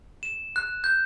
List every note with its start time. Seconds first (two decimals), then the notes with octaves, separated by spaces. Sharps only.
0.23 E7
0.56 F#6
0.84 G6